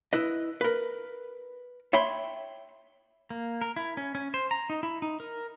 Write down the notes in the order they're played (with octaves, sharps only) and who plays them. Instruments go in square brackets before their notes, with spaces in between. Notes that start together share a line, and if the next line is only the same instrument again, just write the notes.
[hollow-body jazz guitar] E4 B4 D#5
A#4 B4
C#5 E5 G5 B5 C6
[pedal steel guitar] A#3
A#4
E4
C#4
C#4
C5
A#5
D#4
E4
D#4
A#4